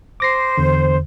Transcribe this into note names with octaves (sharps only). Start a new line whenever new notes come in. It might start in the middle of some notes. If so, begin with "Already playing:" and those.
C5 D6 A#6 C7
E2 D3